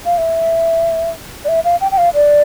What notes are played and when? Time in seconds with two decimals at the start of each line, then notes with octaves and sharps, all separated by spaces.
0.05 F5
0.18 E5
1.45 D5
1.48 E5
1.65 F5
1.81 G5
1.92 G5
1.98 F5
2.14 D5